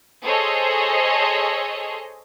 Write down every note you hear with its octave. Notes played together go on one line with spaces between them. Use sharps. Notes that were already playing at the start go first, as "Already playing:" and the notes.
G#4 A4 C5 C#5 D#5